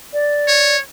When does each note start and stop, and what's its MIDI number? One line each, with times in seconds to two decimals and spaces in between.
0.13 0.76 74
0.48 0.80 73